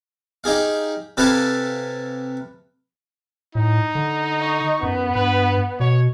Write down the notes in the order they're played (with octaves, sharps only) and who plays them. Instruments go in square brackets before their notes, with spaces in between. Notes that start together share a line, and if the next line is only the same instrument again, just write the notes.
[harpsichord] D#4 G4 G#4 F5
C3 G4 A4 B4 F5 G#5
[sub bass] A2 [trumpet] D#4
[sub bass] D3
[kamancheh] D#5 C#6
[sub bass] F#2 [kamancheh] B3
[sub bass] G2 [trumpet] B4
[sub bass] B2 [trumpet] C#5